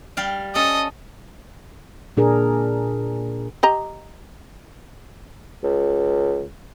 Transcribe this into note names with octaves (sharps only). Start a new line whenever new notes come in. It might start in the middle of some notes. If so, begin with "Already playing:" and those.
G3 F5 G5
C#4 A4 D#5
A#2 D4 G#4 A#4
G4 D#5 A#5
C#2